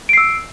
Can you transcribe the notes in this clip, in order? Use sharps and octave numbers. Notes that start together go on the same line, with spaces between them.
E6 C7 D7